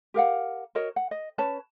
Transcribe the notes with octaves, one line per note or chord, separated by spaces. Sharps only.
G4 A#4 F5 F#5
F#4 A#4 C#5 D#5
F#5
D#5
C#4 B4 C#5 A5